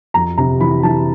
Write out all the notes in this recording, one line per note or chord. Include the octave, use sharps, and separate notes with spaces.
F2 A#5
C3 A#5
E3 B5
E3 A5